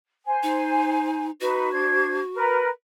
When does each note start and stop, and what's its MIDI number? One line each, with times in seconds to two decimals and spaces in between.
0.25 1.27 72
0.25 1.27 80
0.43 1.31 63
1.40 1.71 63
1.40 2.61 66
1.40 1.71 71
1.71 2.19 62
1.71 2.19 72
1.71 2.19 92
2.34 2.67 70
2.34 2.67 71